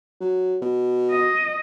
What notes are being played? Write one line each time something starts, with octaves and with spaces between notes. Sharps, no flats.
F#3
B2
D#5